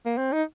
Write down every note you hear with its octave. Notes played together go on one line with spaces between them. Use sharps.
A#3
C4
D#4